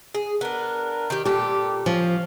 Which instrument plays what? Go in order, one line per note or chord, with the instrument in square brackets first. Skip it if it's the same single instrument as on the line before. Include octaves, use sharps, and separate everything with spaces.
[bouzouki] G#4
[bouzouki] B3 D4 [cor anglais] A#4
[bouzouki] D#3 G4
[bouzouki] A#2 A4 [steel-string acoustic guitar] G4 [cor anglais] D5
[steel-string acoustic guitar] F3 [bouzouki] C#4 [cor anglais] F5